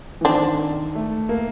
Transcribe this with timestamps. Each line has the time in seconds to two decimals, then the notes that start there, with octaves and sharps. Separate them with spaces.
0.21 E3
0.25 D#3 C4 D4
0.95 A3
1.29 A#3